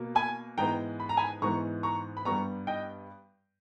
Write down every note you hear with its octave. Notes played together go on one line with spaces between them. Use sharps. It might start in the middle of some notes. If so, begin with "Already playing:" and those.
Already playing: B2 A#3
G#5 B5
G#2 E3 G#3 B3 G5 A#5
B5
A#5
G#5 B5
G#2 E3 G#3 B3 A#5 C#6
A#5 C#6
B5
G2 G3 B3 A#5 C#6
D#5 G5